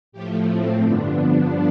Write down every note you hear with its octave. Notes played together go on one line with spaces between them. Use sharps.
A2 F3 A3 G4
C4
G2 D3 F3 B3 D4